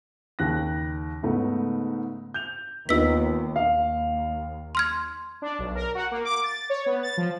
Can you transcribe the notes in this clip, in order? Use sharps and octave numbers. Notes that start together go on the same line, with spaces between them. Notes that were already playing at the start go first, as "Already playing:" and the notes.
D#2 C#3 F#6 A#6
G#2 C#3 A3 B3 D#4
G6 F7
D#2 B3 D#4 F4 E6 B6
D#2 F5
C6 F6 G#6
D4
B1
A#4
F#4
A#3
D6
A6
C#5
B3
A6
F3